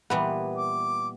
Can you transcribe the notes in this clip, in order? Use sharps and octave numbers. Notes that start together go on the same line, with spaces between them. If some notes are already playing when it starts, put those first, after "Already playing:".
A#2 E3 G3 B3
D6